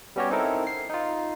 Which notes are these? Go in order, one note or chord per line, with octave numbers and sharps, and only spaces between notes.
G3 B3 C#4 F#4 G4 C#5
C4 D#4 E4 A4 A#4
C7
D#4 F4